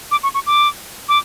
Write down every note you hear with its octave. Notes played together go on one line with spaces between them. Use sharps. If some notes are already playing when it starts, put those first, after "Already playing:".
D6
C#6
C#6
D6
D6